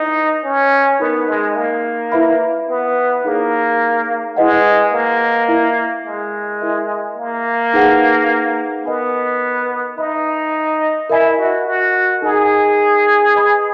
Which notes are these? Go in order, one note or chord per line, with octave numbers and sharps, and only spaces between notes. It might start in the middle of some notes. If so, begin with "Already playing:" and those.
Already playing: D#4 E4 B4 D#5 G#5
C#4
B3 D#4 A#4 D#5
G#3
A#3
E4 B4 E5 B5
B3
A#3 D#4 G#4 C#5
G#3 E4 B4 D#5 F#5
A#3
E4 A#4 E5
G#3
E4 A#4 E5 G#5
A#3
D#4 G#4 B4 F#5
B3 A#4 D#5 G#5
D#4 B4 E5 B5
E4 A#4 D#5 G#5 B5
F#4
F#4
D#4 G#4 A#4 D#5 F#5 A#5
B4 D#5 G#5 B5